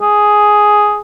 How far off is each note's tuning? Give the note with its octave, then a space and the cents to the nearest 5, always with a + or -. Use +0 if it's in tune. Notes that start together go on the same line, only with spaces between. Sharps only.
G#4 +5